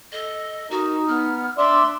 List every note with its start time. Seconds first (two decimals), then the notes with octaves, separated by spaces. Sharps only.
0.12 A4 D#5
0.71 D#4 F#4 A#4
1.08 B3 F6
1.58 D4 D5 E5 C6